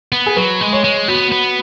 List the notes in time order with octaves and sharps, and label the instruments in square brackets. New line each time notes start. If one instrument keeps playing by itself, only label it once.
[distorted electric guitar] B3
[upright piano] G#4
[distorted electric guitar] F#3 [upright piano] B4
[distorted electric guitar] G#3
[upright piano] C#5
[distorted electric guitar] G#3
[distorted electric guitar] B3 [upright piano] F#4
[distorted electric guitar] B3